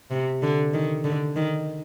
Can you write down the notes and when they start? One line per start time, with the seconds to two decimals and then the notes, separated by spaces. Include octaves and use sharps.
0.11 C3
0.42 D3
0.74 D#3
1.04 D3
1.36 D#3